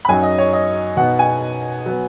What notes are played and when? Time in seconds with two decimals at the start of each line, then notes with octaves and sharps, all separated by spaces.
0.05 B5
0.08 F#2 F#3 D#4 G#5
0.23 D#5
0.38 C#5
0.53 D#5
0.97 B2 B3 D#4 F#5
1.19 G#5
1.86 F#3 B3